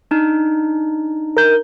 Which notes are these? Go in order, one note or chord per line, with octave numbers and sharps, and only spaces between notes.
D4 D#4
A#4 G6